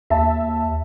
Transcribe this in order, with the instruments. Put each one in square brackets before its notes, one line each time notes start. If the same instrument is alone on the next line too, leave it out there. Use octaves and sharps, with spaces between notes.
[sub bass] D#2 [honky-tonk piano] E5 A5